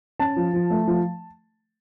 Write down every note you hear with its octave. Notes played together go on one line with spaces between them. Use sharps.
C#4 A5
F3
F3
A3
F3